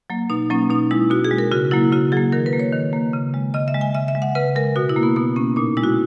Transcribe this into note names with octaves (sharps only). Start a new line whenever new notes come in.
F#3 A#3
B2 D#4
F#3 A#3 C#4
B2 D#4
G#3 E4
B2 F#4
G#4
G#3
A#4
C#3 F#4
F#3 A#3 E4
C#3 F#4
F#3 A#3 G#4
D#3 A#4
B4
A#3
C#5
D#3
A#3
C#3
G#3
C#3 D#5
E5
G#3
G#5
C#3 E5
E5
G#3
F#5
C#3 B4
G#3 A#4
B2 F#4
E4
A#3
B3
B2 B3
A#3 C#4
A#2 D#4
G#3 E4
F#4